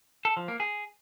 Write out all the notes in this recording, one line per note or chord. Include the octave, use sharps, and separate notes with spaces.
A4
F3
A#3
G#4